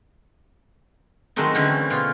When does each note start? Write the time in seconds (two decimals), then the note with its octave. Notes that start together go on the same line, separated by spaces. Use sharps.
1.36 D#3 F#3 G#3 A3 C4 D#4
1.55 D3 E3 C4 C#4
1.90 B2 F4 F5